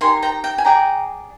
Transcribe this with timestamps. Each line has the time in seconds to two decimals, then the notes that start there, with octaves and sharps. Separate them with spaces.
0.01 D#4 G4 A#4 G#5 C6
0.23 G5 A#5
0.44 G5 A#5
0.58 G#5
0.65 G#4 D5 G5 A#5